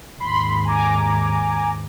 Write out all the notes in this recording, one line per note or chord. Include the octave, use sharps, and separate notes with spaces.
D#2 G#2 B5 C6
G#5 A#5 D6